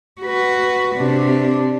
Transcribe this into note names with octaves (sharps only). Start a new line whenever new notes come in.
F#4 B4
C3 D4